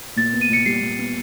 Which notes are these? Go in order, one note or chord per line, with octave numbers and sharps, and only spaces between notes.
A#2 A6
B3
D#7
A#2 C#7
G3 C7
A#2
B3